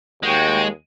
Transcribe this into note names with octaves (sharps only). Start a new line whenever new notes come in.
D#2 G#3 F#4 G5